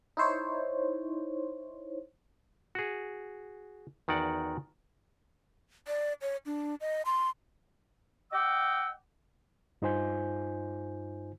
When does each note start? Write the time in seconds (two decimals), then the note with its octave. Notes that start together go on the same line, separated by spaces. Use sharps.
0.17 D#4 E4 C5 C#5
2.75 F#4 G#4
4.08 E2 D#3 F#4 D5 F#5
5.87 D5
6.21 C#5
6.46 D4
6.81 D#5
7.05 C6
8.32 D#5 F#5 G5 D6 E6
9.82 G2 D#4 F4 C5 G#5 G6